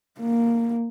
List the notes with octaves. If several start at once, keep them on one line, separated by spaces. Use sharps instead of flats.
A#3